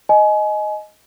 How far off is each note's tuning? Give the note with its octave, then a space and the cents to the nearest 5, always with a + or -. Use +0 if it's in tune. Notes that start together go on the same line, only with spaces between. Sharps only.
D#5 +0 G#5 +30